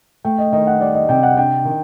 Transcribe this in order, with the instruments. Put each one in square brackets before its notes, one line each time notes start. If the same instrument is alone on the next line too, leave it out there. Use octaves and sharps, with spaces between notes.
[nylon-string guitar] A3 [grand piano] G5
[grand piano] D#5
[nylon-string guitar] D#3 [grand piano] D#5
[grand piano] F#5
[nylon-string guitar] G3 [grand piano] D5
[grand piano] D#5
[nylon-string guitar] C3 [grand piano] G5
[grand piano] F#5
[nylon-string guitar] D4 [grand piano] G5
[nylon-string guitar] D#3